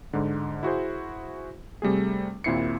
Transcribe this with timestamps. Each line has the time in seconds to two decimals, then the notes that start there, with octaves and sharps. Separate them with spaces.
0.13 G#2 D3
0.63 E4 F#4 G#4 C5
1.82 C3 G3 A3 G#4
2.44 D#2 A#2 C4 E4 C7 C#7